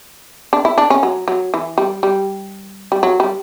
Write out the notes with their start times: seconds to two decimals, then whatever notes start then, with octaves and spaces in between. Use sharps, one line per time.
0.53 D4
0.65 E4
0.78 D4
0.90 C#4
1.03 F#3
1.28 F#3
1.54 E3
1.78 G3
2.03 G3
2.92 G3
3.03 F#3
3.20 G3